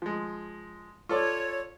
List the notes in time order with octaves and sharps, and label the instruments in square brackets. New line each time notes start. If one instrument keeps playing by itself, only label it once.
[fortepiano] F3 G#3
[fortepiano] F4 A4 D5 [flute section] C#5